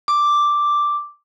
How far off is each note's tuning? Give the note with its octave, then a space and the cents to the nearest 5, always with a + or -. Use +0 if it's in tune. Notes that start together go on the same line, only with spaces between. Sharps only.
D6 +0